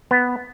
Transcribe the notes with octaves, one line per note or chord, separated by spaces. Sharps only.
B3